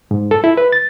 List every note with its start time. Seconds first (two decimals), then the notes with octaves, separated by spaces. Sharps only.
0.11 G#2
0.31 A4
0.44 E4
0.57 B4
0.72 A6